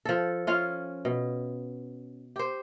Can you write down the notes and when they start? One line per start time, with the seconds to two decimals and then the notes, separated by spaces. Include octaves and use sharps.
0.05 F3 A4
0.47 C#4 F4 F5
1.05 B2
2.36 G4 C5